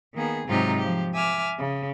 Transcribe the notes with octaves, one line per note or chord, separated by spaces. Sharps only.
D#3 A#3 B3 G#4
G#2 C3 F#3 D#4 F4 G4
F3 G4
E5 G#5 D6 E6 F6
C#3